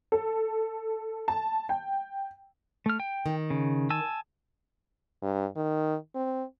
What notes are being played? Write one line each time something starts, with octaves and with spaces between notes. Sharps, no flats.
A4
A5
G5
A3 F6
G5
D#3
C#3
G#5 A5 E6
G2
D#3
C4